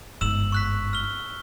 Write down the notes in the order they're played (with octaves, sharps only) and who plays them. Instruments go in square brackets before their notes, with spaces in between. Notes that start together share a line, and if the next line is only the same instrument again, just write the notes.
[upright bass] G1 G#2 [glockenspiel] E6 E7 F#7
[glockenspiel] C#6 F#6 B6
F6 G7